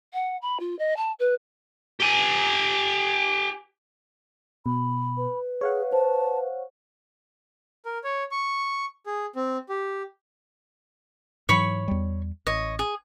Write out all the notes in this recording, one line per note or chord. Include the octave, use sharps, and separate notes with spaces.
F#5
B5
F4
D#5
A5
B4
G4 G#5
B2 B5
B4
G#4 C#5 F5 F#5
C5 A5
A#4
C#5
C#6
G#4
C4
G4
G#2 E3 F#3 C#5 B5 C#6
E2 G3
A1 C#5 D#5
G#4